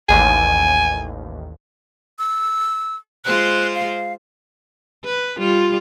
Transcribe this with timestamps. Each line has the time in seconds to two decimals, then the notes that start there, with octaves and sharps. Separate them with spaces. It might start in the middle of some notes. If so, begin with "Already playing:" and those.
0.09 A1 D#2 G#5
2.19 E6
3.25 G#3 F4 C5 F#6
3.75 F5
5.04 B4
5.38 G3 F4